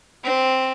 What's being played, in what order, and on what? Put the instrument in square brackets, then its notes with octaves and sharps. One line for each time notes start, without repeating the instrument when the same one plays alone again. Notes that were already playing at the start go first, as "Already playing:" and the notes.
[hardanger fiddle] C4